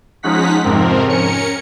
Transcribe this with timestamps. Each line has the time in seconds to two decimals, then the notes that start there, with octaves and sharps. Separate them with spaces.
0.23 F3 G#3 C#4 D#4 F#5 B6
0.64 F2 G#2 C3 F3 C4 A#4
1.07 C#4 A#4 C#7